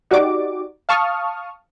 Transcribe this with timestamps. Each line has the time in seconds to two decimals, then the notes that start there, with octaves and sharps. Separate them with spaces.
0.11 D#4 F#4 G4 D5 D6
0.89 F5 A5 C#6 D#6 F6